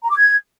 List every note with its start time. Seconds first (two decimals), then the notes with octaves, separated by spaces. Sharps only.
0.02 A#5
0.10 D6
0.17 G#6